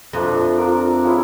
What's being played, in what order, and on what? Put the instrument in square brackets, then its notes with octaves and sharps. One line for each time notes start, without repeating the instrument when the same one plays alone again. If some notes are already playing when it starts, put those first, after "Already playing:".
[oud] F2 [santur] A3 D4 F4 A4
[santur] D4 F4 A#4
F3 G#3 C#4 E4